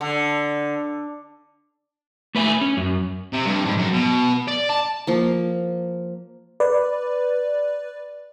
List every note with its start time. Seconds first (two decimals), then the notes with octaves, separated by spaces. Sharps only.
0.01 D3
2.35 A3 B4 E5 G#5
2.61 C#4
2.77 F#2
3.33 C3
3.46 G2
3.65 G#2
3.77 F#2
3.93 B2
4.48 D5
4.69 A5
5.07 F3 A#3
6.60 B4 D5